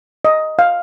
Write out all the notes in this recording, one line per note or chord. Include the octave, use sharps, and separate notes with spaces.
D#5
F5